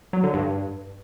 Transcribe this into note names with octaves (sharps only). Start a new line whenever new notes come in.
F#3
D3
G2